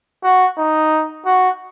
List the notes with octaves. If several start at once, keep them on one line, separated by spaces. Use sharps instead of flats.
F#4
D#4
F#4